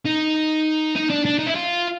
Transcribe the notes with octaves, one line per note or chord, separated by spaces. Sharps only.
D#4
D#4
D4
D4
D#4
E4
F4